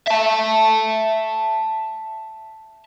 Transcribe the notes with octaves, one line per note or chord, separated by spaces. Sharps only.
E5 A5